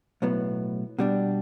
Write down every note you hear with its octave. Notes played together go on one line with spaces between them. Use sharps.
B1 A2 F#3 B3
B2 G3 D4